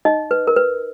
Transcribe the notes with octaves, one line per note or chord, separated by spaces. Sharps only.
D#4 D#5
B4
A#4
B4